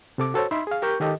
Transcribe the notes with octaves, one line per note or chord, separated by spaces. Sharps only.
C3 A4 D6
F#4 A4 C5 C#5
D#4 E5 B5 C6
G#4 F5
G4 A#4 C#6 G6
D#3 G4 A4 D#5